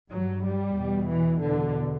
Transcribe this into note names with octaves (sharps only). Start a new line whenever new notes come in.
G2 F#3
G3
E2 B2
E3
E2 B2 D3